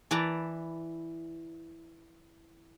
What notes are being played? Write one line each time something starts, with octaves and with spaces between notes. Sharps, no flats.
E3 E4 B4 D5 A5 A#5